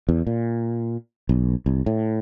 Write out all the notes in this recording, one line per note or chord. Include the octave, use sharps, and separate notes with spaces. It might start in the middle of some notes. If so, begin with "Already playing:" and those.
E2
A#2
B1
C2
A2